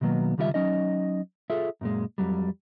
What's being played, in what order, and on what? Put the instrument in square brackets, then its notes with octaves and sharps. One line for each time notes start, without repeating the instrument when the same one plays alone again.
[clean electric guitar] B2 D#3 F#3 A#3 B3
C#2 D#3 G3 F4 A#4 E5
F#3 C#4 D#4 D#5
F4 G#4 A4 E5
F#2 A#2 G#3
F2 F#3 G3